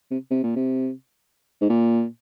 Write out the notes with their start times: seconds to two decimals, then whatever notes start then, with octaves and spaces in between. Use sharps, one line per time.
0.11 C3
0.31 C3
0.43 A#2
0.56 C3
1.61 G#2
1.69 A#2